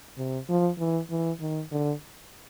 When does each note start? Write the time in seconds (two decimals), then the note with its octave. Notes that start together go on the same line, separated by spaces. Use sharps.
0.17 C3
0.49 F3
0.79 E3
1.10 E3
1.40 D#3
1.71 D3